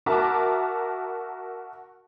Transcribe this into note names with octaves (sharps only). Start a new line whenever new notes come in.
F#4 A#4 E5 A5 A#5 D6